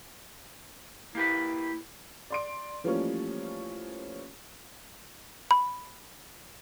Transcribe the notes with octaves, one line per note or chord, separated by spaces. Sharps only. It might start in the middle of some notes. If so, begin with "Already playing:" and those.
A#3 E4 G4 B4
D5 C6 D7
E3 F3 G3 A3 A#3 C#4
B5